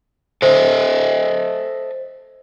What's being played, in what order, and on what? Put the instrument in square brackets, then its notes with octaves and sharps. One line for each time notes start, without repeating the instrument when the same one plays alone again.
[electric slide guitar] A4 D#5 E5 [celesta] C5